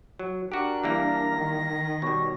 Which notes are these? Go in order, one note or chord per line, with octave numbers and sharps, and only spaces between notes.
F#3
D4 F#4 G4 A#4 F#6
E3 G3 A#3 A#6
D#3
B2 G3 C#5